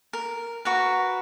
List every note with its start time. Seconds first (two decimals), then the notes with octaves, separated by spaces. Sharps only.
0.13 A#4
0.65 F#4 A#4 B4